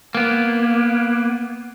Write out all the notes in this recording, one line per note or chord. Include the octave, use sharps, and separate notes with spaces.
A#3 B3